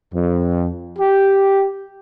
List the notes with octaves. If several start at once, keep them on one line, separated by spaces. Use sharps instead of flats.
F2
G4